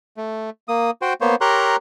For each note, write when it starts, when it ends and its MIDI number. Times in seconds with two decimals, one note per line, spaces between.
0.17 0.50 57
0.68 0.91 58
0.68 0.91 87
1.02 1.13 66
1.02 1.13 72
1.02 1.13 79
1.21 1.35 58
1.21 1.35 59
1.21 1.35 72
1.21 1.35 73
1.41 1.76 67
1.41 1.76 70
1.41 1.76 73
1.41 1.76 82
1.41 1.76 84
1.41 1.76 90